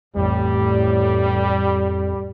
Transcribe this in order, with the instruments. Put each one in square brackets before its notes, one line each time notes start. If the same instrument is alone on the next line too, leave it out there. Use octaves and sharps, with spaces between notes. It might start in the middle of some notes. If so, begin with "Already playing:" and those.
[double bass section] A1 A2 [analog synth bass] F2 [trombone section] G3